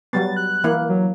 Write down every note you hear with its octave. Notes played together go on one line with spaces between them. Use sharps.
F#3 G3 B3 A6
F#6
E3 A#3 E4
F#3